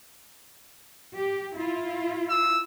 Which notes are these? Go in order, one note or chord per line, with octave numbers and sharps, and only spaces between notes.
G4
E4 F4
E6